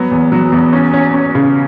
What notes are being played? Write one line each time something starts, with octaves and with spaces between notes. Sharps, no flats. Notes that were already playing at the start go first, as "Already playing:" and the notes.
Already playing: F#3 B3
E2
F#3
E2
C#4
C#4
C#4
C#3